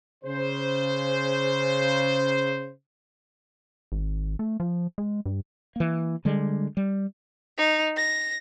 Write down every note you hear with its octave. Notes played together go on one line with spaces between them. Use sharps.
C#3 C5
G#1
A3
F3
G#3
G2
E3 A#3
D3 G3 G#3
G3
D#4
A#6